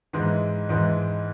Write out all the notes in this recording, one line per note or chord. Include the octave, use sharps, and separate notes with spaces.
G#2 E3 G#3
G#2 E3 G#3